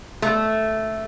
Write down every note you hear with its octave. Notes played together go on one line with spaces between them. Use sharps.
A3